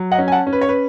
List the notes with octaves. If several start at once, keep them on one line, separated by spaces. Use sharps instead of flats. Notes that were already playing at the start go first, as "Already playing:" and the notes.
Already playing: F#3
D#5 F#5
C#4
G#5
F#5 A5
C#4
B4
C#5
B4